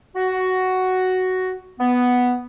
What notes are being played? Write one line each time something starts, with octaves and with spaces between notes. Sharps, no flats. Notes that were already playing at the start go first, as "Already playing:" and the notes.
F#4
B3